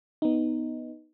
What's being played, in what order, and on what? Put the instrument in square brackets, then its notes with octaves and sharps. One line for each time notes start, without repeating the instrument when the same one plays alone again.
[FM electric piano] B3 D#4